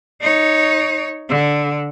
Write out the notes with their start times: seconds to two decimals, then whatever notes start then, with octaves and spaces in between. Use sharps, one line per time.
0.21 D#4 C#5
1.29 D3